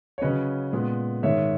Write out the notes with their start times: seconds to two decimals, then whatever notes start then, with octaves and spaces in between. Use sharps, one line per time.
0.18 C#5
0.22 C#3 F#3 C#4 B4 D#5
0.73 A#2 G#3 B3
1.23 G#2 D#3 G#3 C#5 E5